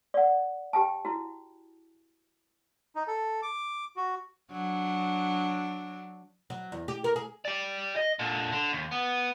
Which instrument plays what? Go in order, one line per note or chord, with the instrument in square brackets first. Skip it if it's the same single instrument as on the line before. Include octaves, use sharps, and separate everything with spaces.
[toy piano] D5 F#5
G4 G5 A5
E4 F#4
[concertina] D#4
A4
D6
F#4
[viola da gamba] F#3 D4
[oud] F#3
E2
G4
A#4
G#4
[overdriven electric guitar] G4 D5
D#5
A#2 D3
D3
D#2
B3